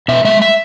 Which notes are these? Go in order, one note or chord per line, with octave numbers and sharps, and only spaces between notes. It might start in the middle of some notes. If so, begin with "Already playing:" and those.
B2 E5
G#3 E5
E5